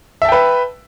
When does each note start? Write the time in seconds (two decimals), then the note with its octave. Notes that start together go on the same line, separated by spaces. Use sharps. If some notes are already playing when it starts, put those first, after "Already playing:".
0.22 E5
0.25 A5
0.28 G5
0.32 B4